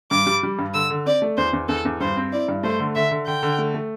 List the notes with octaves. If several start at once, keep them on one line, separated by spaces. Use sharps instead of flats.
G2 D6
G3
G3
G2
D3 E6
D3
C4 D5
A3
E2 C5
E2
E2 A4
E2
G2 C5
C4
E4 D5
G2
A3 C5
D3
D3 E5
D3
D3 G5
D3
A3
A3